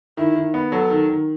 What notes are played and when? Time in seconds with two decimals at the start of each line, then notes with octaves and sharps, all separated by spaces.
0.17 D#3 E4
0.35 D#3
0.54 B3
0.72 F#3 A4
0.90 D#3
1.09 D#3